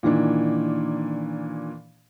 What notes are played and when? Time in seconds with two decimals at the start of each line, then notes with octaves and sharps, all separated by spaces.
0.03 A#2 D#3 E3 D4